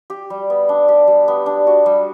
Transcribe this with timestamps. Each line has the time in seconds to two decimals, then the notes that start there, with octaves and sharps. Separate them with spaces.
0.10 G4
0.30 G3
0.50 B3
0.69 D4
0.88 G4
1.07 G3
1.28 B3
1.46 D4
1.67 F#4
1.86 G3